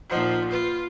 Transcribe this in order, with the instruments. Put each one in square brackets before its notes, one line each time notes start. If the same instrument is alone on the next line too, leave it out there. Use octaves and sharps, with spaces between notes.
[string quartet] A#2 F3 [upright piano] D#4 C5 F#5
[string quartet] F4 [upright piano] B4